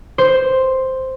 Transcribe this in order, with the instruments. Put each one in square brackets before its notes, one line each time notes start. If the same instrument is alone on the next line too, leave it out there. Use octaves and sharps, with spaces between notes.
[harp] C5